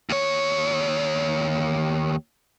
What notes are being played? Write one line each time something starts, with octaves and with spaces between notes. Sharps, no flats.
D#2 C#5